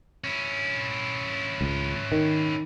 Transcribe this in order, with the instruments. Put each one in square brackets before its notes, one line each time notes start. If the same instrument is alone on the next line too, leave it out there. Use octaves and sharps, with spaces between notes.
[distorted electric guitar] C#4 E4
[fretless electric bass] C#2
D#3